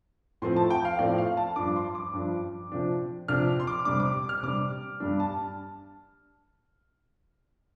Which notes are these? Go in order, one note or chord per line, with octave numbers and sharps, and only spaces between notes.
A2 F3 C4 C6
A5
G5
F5
A2 F3 C4 D5
F5
A5
G2 F3 D4 D6
C6
D6
G2 F3 D4
C3 F3 D4
C3 F3 D4 F6
C6
D6
C3 G3 D4 D6
D6
F6
C3 G3 D4 D6
G2 G3 D4
A5